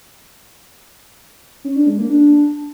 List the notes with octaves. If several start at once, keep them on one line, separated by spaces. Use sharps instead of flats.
C#4
D4
G#3
A#3
D4